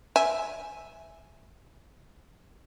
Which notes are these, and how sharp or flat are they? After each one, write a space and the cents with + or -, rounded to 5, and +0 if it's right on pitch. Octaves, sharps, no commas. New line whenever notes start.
E5 +0 G#5 +0